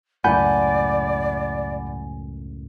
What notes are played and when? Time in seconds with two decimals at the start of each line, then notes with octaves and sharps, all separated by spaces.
0.24 C#2 F#2 A2 D5 F#5 G#5 B5 G6